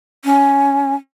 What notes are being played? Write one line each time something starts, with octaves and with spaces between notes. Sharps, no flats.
C#4